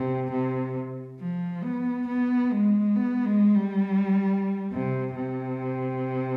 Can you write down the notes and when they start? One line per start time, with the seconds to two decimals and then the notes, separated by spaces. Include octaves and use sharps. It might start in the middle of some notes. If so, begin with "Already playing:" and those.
Already playing: C3
0.31 C3
1.20 F3
1.64 B3
2.08 B3
2.52 G#3
2.95 B3
3.25 G#3
3.55 G3
4.72 C3
5.16 C3